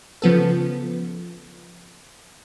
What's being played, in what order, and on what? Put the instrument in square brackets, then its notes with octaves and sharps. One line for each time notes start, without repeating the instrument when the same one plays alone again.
[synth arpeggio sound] C#3 F3 B3 A4